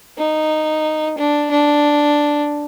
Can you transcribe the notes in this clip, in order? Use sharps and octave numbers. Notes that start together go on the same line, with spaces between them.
D#4
D4
D4